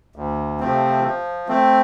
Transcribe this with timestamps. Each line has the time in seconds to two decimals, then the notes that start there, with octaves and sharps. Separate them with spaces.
0.16 D2
0.60 C3 F3 A3 C4
1.04 F3
1.48 A3 C4